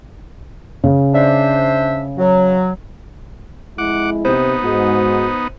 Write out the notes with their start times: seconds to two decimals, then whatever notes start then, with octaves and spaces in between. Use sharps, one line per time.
0.84 C#3
1.14 D4 C5 E5
2.18 F#3
3.78 F2 G#3 E4 F#5 D6
4.25 C3 B3 D#4 C5
4.63 G#2 F#4